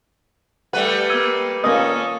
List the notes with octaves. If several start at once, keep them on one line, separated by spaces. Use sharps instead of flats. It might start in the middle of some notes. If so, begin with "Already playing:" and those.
G3 A3 B4 F#5
A#3 E6 G#6 D#7
A#3 C#4 A4 D#5 D#6